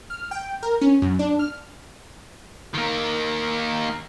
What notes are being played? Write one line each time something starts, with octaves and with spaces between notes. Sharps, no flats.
F6
G5
A#4
C#4
F#2
D4
F6
D#3 A#3